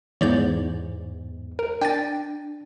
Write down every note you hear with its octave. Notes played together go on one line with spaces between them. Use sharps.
E2 G#2 C#5 D5 G6
A#4
D4 G5 G#5 A6